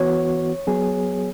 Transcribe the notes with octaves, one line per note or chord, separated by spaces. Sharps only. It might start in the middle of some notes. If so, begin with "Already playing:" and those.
Already playing: E3 B3 F#4 C#5
F#3 B3 G#4